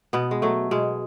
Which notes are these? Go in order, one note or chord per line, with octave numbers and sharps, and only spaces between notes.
B2 B3
G#3
F#3 A3
B2 G#3